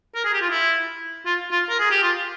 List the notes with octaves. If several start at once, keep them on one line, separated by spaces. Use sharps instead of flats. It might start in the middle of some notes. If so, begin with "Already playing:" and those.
A#4
G#4
G4
F4
E4
F4
F4
A#4
G#4
G4
F4